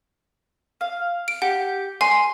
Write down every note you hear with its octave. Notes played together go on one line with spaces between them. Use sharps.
F5
D7
G4 F#5
G#5 C6